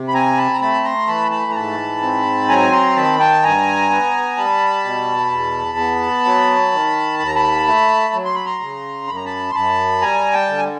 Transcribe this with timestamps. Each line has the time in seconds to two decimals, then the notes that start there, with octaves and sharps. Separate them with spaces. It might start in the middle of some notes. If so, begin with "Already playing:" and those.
Already playing: C3
0.08 B5
0.13 C4 G#5 A#5
0.37 A5 B5
0.54 A#5
0.61 A3 A5 B5
0.84 A#5 C6
1.07 E3 A5 B5
1.31 A5 B5
1.51 A#5
1.55 G#2 A5 B5
2.02 C4
2.49 F#3 G#5 A#5
2.72 A#5 C6
2.96 D#3 A5 B5
3.19 G5 A5
3.43 G2 G#5 A#5
3.90 B3
4.37 G3 A5 B5
4.85 B2
5.31 E2
5.78 B3
6.25 F#3
6.72 D#3
7.19 D#2 B5
7.27 A#5
7.35 A5 B5
7.67 A3
8.14 F#3
8.25 C6
8.35 B5
8.45 A#5 C6
8.61 C#3
9.08 F#2 B5
9.16 A#5
9.26 A5 B5
9.51 C6
9.54 F#2 A5 B5
10.01 G3 G#5 A#5
10.33 G5 A5
10.49 D3
10.58 G#5